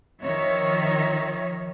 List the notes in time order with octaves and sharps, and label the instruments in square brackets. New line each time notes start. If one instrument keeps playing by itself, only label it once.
[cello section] D#3 F3 C#5 E5